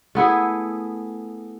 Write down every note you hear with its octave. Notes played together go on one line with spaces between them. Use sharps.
A3 B3 E4 G#4